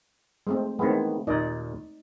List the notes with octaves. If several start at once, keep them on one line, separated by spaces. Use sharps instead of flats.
G#3 A3 C4
D#3 E3 G#3 A3 B3 C4
D#2 A#2 D#4 D5 D#5